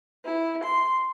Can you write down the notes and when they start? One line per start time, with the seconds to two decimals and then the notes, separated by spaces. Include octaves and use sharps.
0.24 E4
0.64 C6